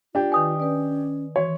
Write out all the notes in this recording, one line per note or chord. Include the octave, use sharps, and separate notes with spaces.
D4 F4 G4
D#3 B4 G#5 D#6
C#4 B4 D5
E3 F#4 C#5